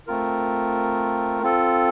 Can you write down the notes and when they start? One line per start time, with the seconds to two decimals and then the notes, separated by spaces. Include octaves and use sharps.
0.07 A3 C4 F4 A#4
1.42 C4 F4 A4